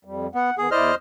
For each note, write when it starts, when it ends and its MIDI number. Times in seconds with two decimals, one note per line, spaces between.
0.05 0.27 41
0.05 0.27 55
0.35 0.50 59
0.35 0.55 78
0.58 0.67 51
0.58 0.67 59
0.58 0.70 68
0.71 0.91 40
0.71 0.91 64
0.71 0.95 72
0.71 0.91 74
0.71 0.95 75
0.71 0.95 89